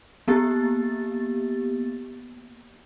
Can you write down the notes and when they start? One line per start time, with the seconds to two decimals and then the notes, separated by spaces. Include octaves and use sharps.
0.28 A#3 B3 G4 A6